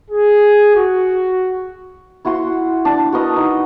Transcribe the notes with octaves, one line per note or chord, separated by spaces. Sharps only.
G#4
F#4
E4 F#4 F#5 C6
D4
F#4 A#4 B4 D#5
D#4